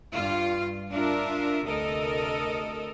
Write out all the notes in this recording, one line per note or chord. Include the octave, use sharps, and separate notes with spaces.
G2 F4
D4 F4 A#4 E5
D2 C3 A4 A#4 D#5